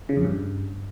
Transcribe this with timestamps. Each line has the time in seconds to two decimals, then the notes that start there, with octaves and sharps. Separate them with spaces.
0.09 C#3
0.17 F2
0.25 G2